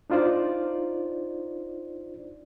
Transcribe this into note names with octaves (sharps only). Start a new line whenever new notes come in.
D4 D#4 F4 C5 D5